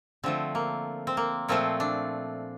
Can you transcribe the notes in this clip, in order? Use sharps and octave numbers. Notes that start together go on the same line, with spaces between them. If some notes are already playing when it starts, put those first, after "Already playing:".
D3 F3 A3 C4
A#3
C4
A#3
A#2 F3 A3 C4
D4